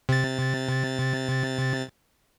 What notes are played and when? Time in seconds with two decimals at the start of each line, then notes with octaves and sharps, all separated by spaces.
0.09 C3 A6